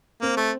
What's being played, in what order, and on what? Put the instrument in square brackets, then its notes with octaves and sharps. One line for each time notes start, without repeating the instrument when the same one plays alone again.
[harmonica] A#3 [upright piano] C4
[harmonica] A3